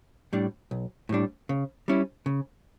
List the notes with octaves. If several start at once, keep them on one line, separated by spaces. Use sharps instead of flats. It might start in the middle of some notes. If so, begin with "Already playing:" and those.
A2 G3 D4
B1
A2 G3 D4
C#3
G3 C#4 E4
C#3